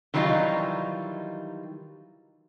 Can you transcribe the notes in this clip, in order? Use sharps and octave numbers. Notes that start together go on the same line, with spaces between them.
D#3 E3 F#3 G3 D#4 F4